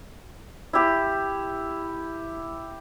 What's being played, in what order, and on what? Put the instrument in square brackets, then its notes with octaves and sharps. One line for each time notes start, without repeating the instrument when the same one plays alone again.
[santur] E4 G4